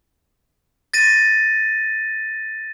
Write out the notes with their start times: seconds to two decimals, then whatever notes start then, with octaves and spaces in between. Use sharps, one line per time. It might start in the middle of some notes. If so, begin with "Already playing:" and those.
0.94 A6 A#6 D#7